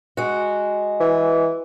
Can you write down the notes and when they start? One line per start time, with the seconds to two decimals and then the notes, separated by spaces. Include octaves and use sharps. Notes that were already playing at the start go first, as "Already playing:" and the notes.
0.17 G#3 F#4
1.00 E3